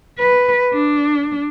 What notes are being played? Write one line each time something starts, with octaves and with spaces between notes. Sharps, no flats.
B4
D4